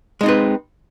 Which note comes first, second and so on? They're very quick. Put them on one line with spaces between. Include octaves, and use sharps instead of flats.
G#3 D#4 C4 B4